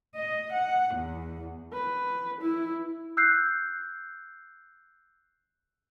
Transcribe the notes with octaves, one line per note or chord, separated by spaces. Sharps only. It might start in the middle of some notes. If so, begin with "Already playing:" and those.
D#5
F#5
E2
B4
E4
E6 F#6 G6 C7